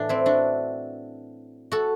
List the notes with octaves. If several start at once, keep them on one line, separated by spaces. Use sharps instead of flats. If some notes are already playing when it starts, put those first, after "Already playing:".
Already playing: A2 E3 D4
C4 E4
D4 F#4
F#4 A4